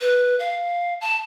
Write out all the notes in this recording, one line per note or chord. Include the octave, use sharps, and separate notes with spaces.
B4
F5
A5